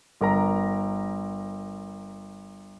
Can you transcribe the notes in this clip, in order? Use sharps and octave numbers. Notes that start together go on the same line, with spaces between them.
G1 A#4 A#5